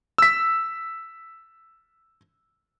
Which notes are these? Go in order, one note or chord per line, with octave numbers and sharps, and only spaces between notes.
E6 B6